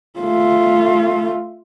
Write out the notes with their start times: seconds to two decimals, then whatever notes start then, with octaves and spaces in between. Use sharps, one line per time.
0.20 A3 F4